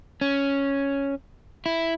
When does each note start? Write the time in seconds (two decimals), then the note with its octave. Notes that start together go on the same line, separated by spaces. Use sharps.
0.21 C#4
1.66 E4